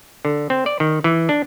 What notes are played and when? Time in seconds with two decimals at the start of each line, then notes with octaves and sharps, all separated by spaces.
0.25 D3
0.50 C4
0.66 D5
0.80 D#3
1.04 E3
1.29 D4